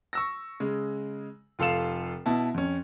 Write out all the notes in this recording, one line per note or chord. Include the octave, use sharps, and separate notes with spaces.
C#6 E6 A#6
C#3 G#3
F1 F4 A4 F5 E7
B2 E4 A5
F2 C#4